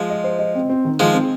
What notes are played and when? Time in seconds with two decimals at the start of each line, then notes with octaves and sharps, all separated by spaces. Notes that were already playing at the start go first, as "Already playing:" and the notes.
Already playing: F3 G#3
0.10 D#5
0.24 C5
0.39 D#5
0.55 C4
0.69 C4
0.85 D#3
1.00 D#3 F3 G#3
1.14 C4